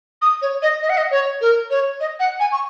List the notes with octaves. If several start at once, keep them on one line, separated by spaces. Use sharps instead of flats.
D#6
C#5
D#5
D#5
F#5
D#5
C#5
A#4
C#5
D#5
F#5
G#5
C#6